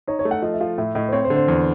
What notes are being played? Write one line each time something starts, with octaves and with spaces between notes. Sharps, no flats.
D#4 C#5
C#5
A3
F#5
F3 D#5
E5
F3 F5
A2 E5
A2 D#5
C5
C4 C#5
C5
D3
C5
E2